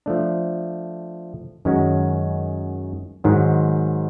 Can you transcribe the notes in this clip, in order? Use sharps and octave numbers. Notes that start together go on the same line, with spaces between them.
F3 A3 D4
F#2 D#3 G#3 C#4 F#4
G#2 D#3 F#3